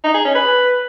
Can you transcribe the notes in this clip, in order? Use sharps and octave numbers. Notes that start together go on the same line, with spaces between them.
D#4
G#4
C#4
B4